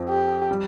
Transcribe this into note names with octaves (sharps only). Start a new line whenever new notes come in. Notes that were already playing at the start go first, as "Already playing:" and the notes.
Already playing: F2 F3 C4
G4
G3